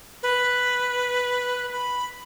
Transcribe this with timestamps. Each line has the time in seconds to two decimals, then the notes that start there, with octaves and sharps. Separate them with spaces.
0.23 B4
1.72 B5